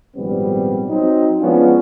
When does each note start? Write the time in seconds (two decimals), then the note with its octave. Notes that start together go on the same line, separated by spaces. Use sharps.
0.16 G#1 A#2 F3 G3 B3 C4
0.89 F#3 C4 D#4
1.41 F3 G#3 B3 C#4 D4 F4